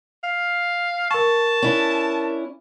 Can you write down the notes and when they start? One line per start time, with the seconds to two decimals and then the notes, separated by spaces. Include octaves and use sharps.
0.24 F5
1.11 A#4 A5 C#6
1.62 C#4 D4 E4